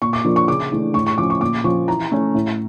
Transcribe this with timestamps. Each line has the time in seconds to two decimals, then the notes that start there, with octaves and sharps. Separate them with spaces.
0.02 A#2 C#6
0.13 D6
0.25 F3 A#3 D4
0.36 C#6
0.48 C#3 D6
0.72 E3 A3 D4
0.94 A2 C#6
1.07 C#6
1.18 F3 C#4 D6
1.30 C#6
1.41 A#2 D6
1.64 F3 C#4 C#6
1.88 E3 A#5
2.12 A3 C#4
2.35 A2